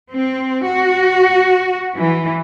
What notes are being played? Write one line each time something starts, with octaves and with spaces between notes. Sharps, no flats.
C4
F#4
E3